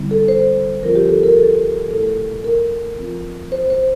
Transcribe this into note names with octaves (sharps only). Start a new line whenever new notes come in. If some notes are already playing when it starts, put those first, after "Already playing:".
Already playing: D3 G3 C4 E4
A4
C5
F3 C4 F4 A#4
G4
A4
A#4
A4
A#2 A3 E4 A4
A#4
F3 C4 F4
C5
C5